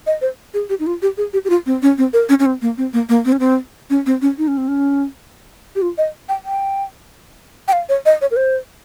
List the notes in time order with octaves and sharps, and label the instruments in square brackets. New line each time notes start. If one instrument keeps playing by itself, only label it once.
[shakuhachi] D#5
C5
G#4
G4
D#4
F4
G4
G#4
G4
G4
F4
C4
C#4
C4
A#4
C#4
C#4
C4
A#3
C4
A#3
A#3
C4
C#4
C4
C#4
C4
C#4
D#4
C#4
C4
C#4
G4
F4
D#5
G5
G5
G5
F5
C#5
D#5
C#5
A#4
C5